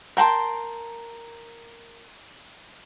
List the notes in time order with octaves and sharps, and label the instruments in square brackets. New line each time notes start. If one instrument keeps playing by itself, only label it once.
[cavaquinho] A#4 G5 A5 C6